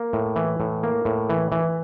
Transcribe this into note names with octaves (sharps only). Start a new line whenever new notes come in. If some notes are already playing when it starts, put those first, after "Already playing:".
Already playing: A#3
A2
E3
A2
A#3
A2
E3
E3